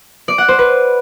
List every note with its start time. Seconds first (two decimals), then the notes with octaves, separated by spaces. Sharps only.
0.28 D5
0.38 F#5
0.48 C5
0.59 B4